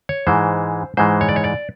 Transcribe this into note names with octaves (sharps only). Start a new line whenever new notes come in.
C#5
G#2 E3 G#3 C5
G#2 E3 G#3 C5
C#5
D5
C#5
D5